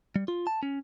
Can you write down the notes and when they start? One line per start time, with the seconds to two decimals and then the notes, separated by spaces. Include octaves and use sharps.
0.16 G3
0.28 F4
0.47 A5
0.63 C#4